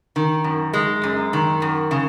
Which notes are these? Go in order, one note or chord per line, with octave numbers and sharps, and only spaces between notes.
D#3
F#2
G#3
F#2
D#3
F#2
C#3